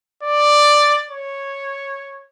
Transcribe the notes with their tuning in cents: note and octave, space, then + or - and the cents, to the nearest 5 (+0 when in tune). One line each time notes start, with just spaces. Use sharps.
D5 +5
C#5 -5